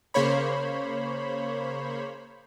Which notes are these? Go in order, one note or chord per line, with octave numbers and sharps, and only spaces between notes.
C#3 A#3 C5 C#5 B5